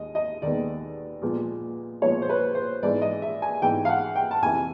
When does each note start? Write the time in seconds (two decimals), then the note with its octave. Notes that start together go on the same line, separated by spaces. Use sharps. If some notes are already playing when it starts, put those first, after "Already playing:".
Already playing: D#2 G#3 D#5
0.15 D#5
0.42 D#2 D#3 G#3 B3 D5
1.22 A#2 F3 G#3 B3
2.02 A#2 F3 G#3 B3 C#5
2.22 C5
2.29 B4
2.55 C5
2.83 G#2 E3 G#3 B3 D5
3.02 D#5
3.22 E5
3.42 G#5
3.62 G#2 E3 G#3 B3 G5
3.85 F5
3.89 F#5
4.16 G5
4.31 A5
4.42 F2 C3 E3 G#5